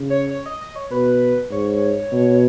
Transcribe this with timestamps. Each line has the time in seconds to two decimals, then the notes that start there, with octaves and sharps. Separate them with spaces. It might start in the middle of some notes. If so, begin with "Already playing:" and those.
Already playing: C#3
0.10 C#5
0.31 C#5
0.46 D#5
0.61 D#5
0.76 C#5
0.91 B2 B4
1.51 G#2 C#5
2.12 B2